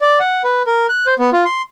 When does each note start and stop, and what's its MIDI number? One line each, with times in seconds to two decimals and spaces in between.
0.01 0.19 74
0.20 0.42 78
0.44 0.62 71
0.67 0.87 70
0.89 1.06 90
1.06 1.14 72
1.19 1.30 59
1.33 1.44 65
1.45 1.62 84